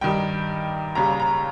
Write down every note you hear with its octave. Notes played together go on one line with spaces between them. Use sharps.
G2 D#3 G3 G5
D#2 C#3 G3 A#5
A#5